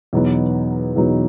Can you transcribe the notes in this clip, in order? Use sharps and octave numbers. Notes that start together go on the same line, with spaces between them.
E2 B2 F#3 B3 D#4
E2 B2 F#3 B3 D#4